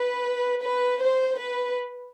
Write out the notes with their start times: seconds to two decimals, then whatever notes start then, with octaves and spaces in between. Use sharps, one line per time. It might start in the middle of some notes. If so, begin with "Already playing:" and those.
Already playing: B4
0.61 B4
1.00 C5
1.37 B4